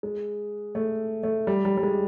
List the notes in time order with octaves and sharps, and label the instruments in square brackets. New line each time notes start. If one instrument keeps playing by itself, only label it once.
[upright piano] G#3
A3
A3
G3
G3
G3
G#3